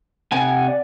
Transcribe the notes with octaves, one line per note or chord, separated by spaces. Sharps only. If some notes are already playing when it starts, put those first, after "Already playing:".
C3 F#5 G#5
D5